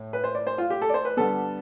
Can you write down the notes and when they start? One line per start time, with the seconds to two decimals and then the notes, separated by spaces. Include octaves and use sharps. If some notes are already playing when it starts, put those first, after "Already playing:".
Already playing: A2 A3
0.13 B4
0.24 C5
0.35 D5
0.47 C5
0.58 F4
0.70 G4
0.82 A4
0.89 D5
0.94 C5
1.05 B4
1.17 D3 G3 B3 A4